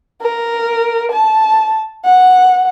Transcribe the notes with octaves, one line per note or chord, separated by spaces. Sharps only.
A#4
A5
F#5